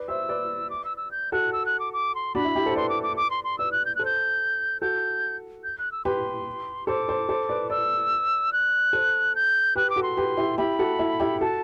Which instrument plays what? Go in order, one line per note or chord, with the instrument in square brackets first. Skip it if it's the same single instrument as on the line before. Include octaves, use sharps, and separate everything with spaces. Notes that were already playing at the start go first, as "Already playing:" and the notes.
Already playing: [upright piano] B4 D5
[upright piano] C5 E5 [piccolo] E6
[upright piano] B4 D5
[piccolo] D6
E6
E6
G6
[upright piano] F#4 A4 [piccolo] F#6
[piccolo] E6
F#6
D6
D6
C6
[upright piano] D4 F#4 [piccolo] B5
[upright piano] E4
E4 G4
A4 C5
[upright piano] B4 D5 [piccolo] C6
[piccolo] D6
D6
D6
C6
C6
[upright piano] B4 D5 [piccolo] E6
[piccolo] F#6
G6
[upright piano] A4 C5 [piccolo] F#6
[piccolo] G6
[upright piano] F#4 A4 [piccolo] G6
[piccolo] G6
F#6
E6
[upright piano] G4 B4 [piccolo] C6
[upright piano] A4 C5 [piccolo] D6
[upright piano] A4 C5
A4 C5
B4 D5
[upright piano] B4 D5 [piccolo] E6
[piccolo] F#6
[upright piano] A4 C5
[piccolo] G6
[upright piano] G4 B4 [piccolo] F#6
[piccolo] D6
[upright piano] F#4 A4
[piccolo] C6
[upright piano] G4 B4
E4 G4
[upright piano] E4 G4 [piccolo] B5
[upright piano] F#4 A4
E4
E4 G4
[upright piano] F#4 A4 [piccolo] A5